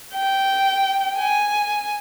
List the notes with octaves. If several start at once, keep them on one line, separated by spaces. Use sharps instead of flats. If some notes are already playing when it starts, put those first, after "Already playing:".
G5
G#5